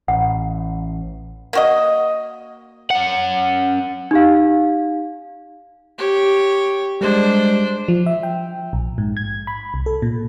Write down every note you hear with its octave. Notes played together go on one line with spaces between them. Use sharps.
A1 F#5
A#3 F#4 D#5
C#4 F#5
D#4 G4 F5
G4 C#5
G3 G#3 D4 C5
F3
E5
G5
A#1
G#2
G#6
B5
C2
A4
A#2